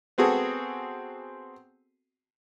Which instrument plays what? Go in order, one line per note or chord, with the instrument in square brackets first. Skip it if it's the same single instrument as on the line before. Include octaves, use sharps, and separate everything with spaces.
[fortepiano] B3 C4 F#4 G#4 A4